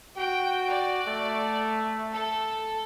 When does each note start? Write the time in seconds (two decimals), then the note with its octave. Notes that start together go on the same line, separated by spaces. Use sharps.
0.18 F#4 G5
0.69 D5
1.08 A3
2.12 A4